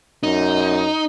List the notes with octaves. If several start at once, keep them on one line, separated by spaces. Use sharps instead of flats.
F#2 D#4